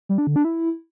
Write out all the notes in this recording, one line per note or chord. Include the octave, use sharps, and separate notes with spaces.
G3
D4
D3
D4
E4